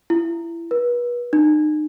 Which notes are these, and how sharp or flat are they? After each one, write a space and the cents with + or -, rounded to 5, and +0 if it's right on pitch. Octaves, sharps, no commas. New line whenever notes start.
E4 +25
B4 -35
D#4 -35